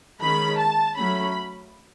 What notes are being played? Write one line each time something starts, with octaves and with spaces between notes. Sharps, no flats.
D#3 G#3 C#4 B5
A5
F#3 A3 C#4 B5